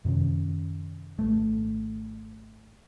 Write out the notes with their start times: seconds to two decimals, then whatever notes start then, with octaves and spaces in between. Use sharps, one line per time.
0.05 F#2 C3 D#3 C#4
1.19 G#1 C#2 A3